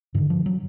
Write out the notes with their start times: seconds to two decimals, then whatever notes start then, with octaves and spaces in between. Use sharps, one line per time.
0.14 G2 D3 D#3
0.30 F3
0.46 F#3